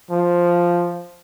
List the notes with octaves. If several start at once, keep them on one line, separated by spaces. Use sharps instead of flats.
F3